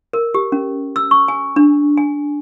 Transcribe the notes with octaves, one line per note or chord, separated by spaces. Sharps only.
A#4
G4
C#4
E6
C#6
G#5
D4
G#5